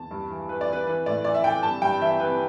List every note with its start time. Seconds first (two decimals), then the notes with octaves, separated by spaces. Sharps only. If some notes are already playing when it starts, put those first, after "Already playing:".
Already playing: E2 A5
0.11 G2
0.30 E3
0.49 E3 B4
0.61 D5
0.68 E3 B4
0.87 E3 B4
1.06 A2 D5
1.24 E3 D5
1.34 E5
1.44 E3 G5
1.63 G2 A5
1.82 G2 G5
2.01 E3 E5
2.20 E3 B4